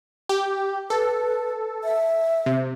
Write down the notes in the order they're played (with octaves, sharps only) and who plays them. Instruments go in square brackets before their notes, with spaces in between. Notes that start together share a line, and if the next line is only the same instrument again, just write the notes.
[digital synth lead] G4
[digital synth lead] A4 [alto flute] B4
[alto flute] E5
[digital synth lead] C3